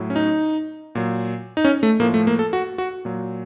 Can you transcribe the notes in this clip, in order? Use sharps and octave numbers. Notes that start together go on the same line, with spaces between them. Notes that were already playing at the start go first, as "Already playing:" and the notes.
Already playing: A2 F#3
C#4
D#4
A#2 F#3
D#4
C#4
A3
A2 F3 A#3
A3
A#3
A4
F#4
F#4
A#2 F#3